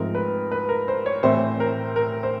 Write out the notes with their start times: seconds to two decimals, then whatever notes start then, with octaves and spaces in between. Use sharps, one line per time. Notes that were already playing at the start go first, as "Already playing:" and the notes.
Already playing: G#2 F3 A3 C4 A#4
0.15 B4
0.52 B4
0.69 A#4
0.88 C5
1.06 C#5
1.23 A2 E3 A3 C4 C5
1.60 A#4
1.96 A#4
2.23 C5